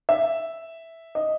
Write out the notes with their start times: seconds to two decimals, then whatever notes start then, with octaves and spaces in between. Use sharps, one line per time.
0.09 E5
1.15 D#5